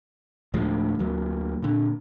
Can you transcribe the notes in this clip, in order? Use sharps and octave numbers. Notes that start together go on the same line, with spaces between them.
D1 D2 F3 G#3
D2 F#3 A#3
A#2 D3